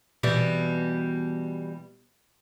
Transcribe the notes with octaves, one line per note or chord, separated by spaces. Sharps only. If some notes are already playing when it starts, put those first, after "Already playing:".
B2 E3 G3